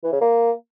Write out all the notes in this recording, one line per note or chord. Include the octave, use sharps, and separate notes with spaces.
E3
C#3
A#3